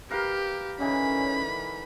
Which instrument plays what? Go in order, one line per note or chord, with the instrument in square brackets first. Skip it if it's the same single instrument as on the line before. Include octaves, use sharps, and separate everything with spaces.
[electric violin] G4 [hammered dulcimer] A#4 B4 F5
[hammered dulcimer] D3 E3 D#4 [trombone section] C#4 [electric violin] B5